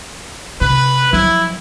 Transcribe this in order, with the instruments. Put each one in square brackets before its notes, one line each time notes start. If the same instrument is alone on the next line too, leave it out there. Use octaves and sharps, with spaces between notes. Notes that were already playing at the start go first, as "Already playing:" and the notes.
[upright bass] C3 [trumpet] B4
[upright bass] F3 F#3 [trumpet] E4